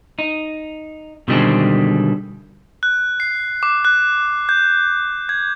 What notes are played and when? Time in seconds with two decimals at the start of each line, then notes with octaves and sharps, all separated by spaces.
0.19 D#4
1.28 B2 D3 D#3 G3 G#3 C4
2.83 F#6
3.20 C7
3.63 D6
3.85 F#6
4.49 G6
5.29 G#6